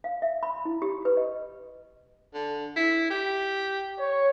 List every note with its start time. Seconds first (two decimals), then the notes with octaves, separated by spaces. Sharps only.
0.04 F5
0.22 E5
0.43 B5
0.65 E4
0.82 G4
1.05 B4
1.17 D#5
2.33 D3
2.76 E4
3.10 G4
3.99 C#5